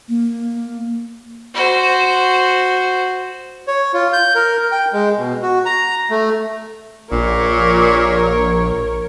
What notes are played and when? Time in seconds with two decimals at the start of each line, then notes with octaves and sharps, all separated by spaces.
0.09 A#3
1.55 F#4 C5
3.67 C#5
3.93 F4
4.13 G6
4.35 A#4
4.72 G5
4.93 G#3
5.18 B2
5.42 F#4
5.66 A#5
6.10 A3
7.12 A#1 A#2 A#4 C#5